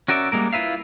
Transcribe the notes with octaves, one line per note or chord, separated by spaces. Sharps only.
C#4 F#4 A#4 D5 E5
G3 G#3 A#3 A#4
E4 F4 B4 E5 F5